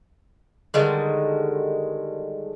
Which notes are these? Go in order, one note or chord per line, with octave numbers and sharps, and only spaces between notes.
D3 D#3 G3 G#3